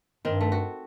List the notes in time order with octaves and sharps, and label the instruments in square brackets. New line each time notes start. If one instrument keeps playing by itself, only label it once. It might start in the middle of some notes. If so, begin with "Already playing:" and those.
[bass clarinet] G2 [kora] D#3 C4
[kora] A3
F#4